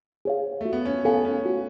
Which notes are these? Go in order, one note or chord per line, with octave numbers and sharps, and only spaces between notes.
G#4 C#5 F5
A3 F#4
B3
C#4
B3 A4 F5 G#5
C#4
F#4